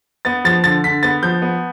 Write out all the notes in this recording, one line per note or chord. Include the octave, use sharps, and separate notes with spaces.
B3 A6
F3 A6
D3 A6
D3 B6
B3 A6
F3 G6
B3